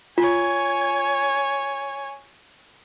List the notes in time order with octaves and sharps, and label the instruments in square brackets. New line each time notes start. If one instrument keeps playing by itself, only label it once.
[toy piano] F4 [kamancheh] C#5 G#5